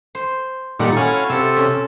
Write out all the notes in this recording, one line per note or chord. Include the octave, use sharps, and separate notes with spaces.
C5
A#2 D#3 G3 A4 F#5
C#4 E4 F#4 F5 G#5
C3 F4 A4 E6
C#4